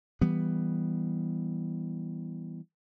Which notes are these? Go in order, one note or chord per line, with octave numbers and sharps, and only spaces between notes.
E3 G3 B3